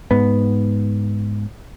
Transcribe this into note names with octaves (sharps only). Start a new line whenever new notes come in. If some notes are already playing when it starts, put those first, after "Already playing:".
G#2 B3